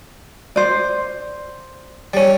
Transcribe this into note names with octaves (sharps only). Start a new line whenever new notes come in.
C5 D5
G3 C#4